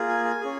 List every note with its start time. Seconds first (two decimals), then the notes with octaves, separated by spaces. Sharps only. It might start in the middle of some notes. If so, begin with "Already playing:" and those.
Already playing: A#3 F4 G#4
0.09 G#5
0.25 G#5
0.41 C#4 G#4